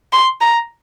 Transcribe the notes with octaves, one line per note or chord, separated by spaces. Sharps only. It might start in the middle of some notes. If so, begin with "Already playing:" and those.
C6
A#5